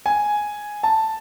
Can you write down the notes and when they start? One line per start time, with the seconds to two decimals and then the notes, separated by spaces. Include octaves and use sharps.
0.06 G#5
0.83 A5